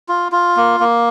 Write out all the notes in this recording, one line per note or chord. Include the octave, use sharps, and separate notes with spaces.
F4
F4
A#3
A#3